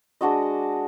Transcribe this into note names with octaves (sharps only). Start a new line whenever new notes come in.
G#3 D4 F#4 D#5